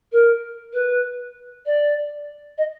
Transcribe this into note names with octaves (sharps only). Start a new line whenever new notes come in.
A#4
B4
D5
D#5